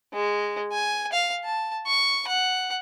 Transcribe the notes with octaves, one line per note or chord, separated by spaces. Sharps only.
G#3
G#5
F5
A5
C#6
F#5